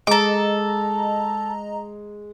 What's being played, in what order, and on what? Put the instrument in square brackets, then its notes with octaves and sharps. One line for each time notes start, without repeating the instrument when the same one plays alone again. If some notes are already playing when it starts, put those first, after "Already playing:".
[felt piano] G#3 [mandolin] A4 D6 [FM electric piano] D#5 A#5